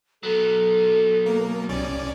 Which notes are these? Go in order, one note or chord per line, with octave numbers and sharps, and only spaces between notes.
F#3 B3 A4
A#3
C2 C#4 D5